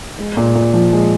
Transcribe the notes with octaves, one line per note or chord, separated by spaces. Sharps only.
G#3
A#2
A#2
F3
G#3